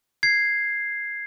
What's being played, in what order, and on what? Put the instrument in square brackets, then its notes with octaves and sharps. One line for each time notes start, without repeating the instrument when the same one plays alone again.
[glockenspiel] G#6 C7